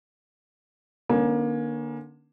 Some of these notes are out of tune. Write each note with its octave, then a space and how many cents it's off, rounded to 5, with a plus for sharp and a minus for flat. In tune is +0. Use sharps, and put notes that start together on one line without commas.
D3 +25 A#3 +30 C#4 +0